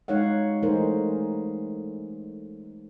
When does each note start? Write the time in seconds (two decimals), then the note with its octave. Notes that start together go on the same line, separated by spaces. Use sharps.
0.08 G#3 D#4 C#5 F5 F#5
0.62 E3 A3 D#4 G#4 A#4 C5